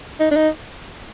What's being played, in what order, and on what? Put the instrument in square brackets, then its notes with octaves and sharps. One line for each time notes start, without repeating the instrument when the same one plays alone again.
[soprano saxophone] D#4
D4
D#4